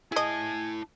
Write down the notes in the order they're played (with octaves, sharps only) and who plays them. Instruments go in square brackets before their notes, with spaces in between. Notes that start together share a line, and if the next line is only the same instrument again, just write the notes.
[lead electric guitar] E4 A5 [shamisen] G#4 D#5 [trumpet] G#5